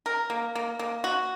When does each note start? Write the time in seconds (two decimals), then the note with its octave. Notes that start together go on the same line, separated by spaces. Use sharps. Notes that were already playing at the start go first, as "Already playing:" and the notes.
0.06 A#4
0.30 A#3
0.55 A#3
0.79 A#3
1.04 F#4